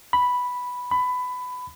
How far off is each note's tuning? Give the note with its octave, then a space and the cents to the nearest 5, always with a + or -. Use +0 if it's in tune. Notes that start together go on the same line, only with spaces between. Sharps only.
B5 +0
B5 +20